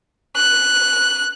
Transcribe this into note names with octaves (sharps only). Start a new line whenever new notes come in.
F#6